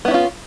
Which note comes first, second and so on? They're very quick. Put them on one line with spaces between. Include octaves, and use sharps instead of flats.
B3 E4 C#4 F4